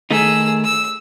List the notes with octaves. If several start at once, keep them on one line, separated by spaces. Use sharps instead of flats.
D#3 A3 D#4 G#4 E6
E6